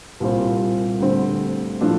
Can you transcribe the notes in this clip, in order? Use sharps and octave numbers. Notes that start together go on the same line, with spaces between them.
C2 A#2 G3 C4 F4
D2 D3 G3 C4
A2 F3 A3 D4 A4